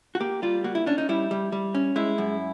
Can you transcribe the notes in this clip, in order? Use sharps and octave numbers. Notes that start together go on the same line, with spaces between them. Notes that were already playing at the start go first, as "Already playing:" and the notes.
F#4
A#3 G4
G3 F4
A#3 F#4
E4
C#4 D4
D#4
G3 E4
G3
G3
C#4
G#3 E4
F#2